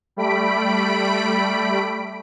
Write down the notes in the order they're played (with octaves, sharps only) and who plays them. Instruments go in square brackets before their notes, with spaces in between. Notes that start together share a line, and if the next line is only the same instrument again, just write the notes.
[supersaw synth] G3 A3 B5 B6 D7